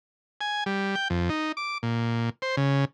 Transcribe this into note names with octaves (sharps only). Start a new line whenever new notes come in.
G#5
G3
G5
F2
D#4
D6
A#2
C5
C#3